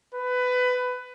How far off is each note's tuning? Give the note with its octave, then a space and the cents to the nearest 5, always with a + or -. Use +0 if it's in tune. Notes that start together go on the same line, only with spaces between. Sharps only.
B4 +20